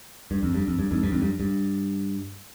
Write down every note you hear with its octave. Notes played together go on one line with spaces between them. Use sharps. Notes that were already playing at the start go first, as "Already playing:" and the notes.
G2
F2
G2
F2
G2
F2 G#2
G2
F2 G#2
G2
G2